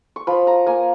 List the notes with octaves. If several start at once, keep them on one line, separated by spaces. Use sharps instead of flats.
C#6
F3 B5
A#5
A#3 G#5